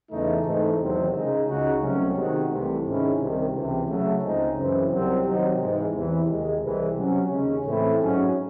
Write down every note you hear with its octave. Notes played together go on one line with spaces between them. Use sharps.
E2 C#3 E3 A3 D#4
G#2 E3 A3 C4 D#4
E2 C3 D#3 F#3 C4
C#3 G#3 D#4
C#2 C#3 G#3 D#4 F#4
C2 C3 F#3 A3 C#4
C3 D#3 G#3 D#4 F#4
C2 C3 E3 A3
G#2 D#3 G#3 C#4 E4
C2 C3 D#3
C#2 C3 E3
C#3 F#3 A3
C#2 C#3 G#3 C4 D#4
F#2 C#3 E3 C4
C2 C3 F#3 C4
C3 D#3 F#3 C4 D#4
G#2 E3 G#3
E2 C3 E3
D#2 D#3 G#3
C2 C3 E3 G#3
C3 F#3 C#4
D#2 C#3 G#3 C#4
A2 E3 A3 C4 E4
G#2 F#3 C#4 F#4